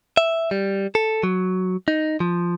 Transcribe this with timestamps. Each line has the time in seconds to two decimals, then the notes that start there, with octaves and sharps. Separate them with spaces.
0.17 E5
0.51 G3
0.95 A4
1.23 F#3
1.88 D#4
2.20 F3